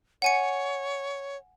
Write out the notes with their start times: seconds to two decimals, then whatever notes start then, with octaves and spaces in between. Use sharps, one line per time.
0.22 C#5 F#5 G#5 C#7